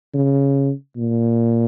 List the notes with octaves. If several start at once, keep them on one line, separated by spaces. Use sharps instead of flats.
C#3
A#2